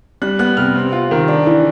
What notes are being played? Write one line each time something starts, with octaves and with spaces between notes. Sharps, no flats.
G3 F#6
B3 F#6
C3 F6
C4
F4
D#3
D4
E3